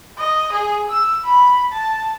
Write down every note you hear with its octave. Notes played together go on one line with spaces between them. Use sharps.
D#5
G#4
E6
B5
A5